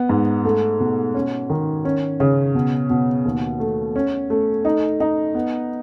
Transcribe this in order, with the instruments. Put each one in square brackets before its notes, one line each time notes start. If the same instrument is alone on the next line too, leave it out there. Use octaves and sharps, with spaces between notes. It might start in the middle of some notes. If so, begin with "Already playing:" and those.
Already playing: [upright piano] B3
G#2
A3
B2
C#4
D#3
C#4
C#3
B2
B2
D#2
A3
C#4
A3
D#4
D#4
B3